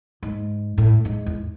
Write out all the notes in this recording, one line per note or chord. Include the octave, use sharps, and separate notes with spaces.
G#2
A2
G#2
E2